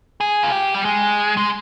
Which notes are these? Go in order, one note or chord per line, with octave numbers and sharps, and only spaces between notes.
G#4
F4
G4
G3
G#3
G#3